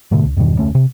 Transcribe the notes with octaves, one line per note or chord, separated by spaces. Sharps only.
G#2 B2 D3 A3
C#2
E2 G2 B2 D#3
F1 D2 A3 C#4
C3